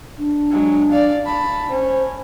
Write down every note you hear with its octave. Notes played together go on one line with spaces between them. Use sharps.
D4
F#3 G#3
D5 F5
A5 B5
C#4 C5